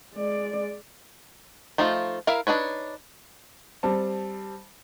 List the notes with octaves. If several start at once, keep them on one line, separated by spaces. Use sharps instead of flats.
G#3 D5
F3 A3 D#4 F4
E4 A#4 E5 F5
D4 D#4 B4 C#5
G3 C4 A5